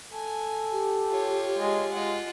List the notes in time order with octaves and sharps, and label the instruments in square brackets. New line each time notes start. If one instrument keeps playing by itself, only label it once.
[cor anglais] A4 [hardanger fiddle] G#5
[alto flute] G4
[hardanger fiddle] F4 C#5
[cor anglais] G#3
[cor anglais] G#3 [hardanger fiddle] F4 F#5